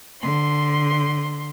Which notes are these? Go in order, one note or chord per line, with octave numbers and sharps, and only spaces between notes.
D3 C6